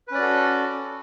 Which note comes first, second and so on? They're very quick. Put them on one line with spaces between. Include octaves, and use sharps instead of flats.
B4 C#4 D5 F#4 A4